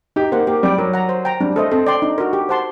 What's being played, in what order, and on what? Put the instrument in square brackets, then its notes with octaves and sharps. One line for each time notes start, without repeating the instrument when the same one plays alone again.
[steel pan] D#4 [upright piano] G4
[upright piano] A#3 [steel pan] G4 C5 F#5
[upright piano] A#3 [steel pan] G4
[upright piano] G3 [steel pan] D5 G5
[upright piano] F#3 [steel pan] A#4
[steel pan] F#5 A#5
C5
G5 A#5
[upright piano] G3 [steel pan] D4
[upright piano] A3 [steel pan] A4 C5 D#5
[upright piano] C4 [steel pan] A4
[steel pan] D5 G5 C6
[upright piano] D4 [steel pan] D#4
[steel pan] F#4 A#4
G4
C5 F#5 A5 C6